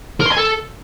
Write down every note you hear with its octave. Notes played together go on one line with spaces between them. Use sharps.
A#4
C6
G#5
A4